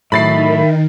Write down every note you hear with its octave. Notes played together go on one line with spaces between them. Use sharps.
A2 D#3 F#3 E5 B5 A6 C7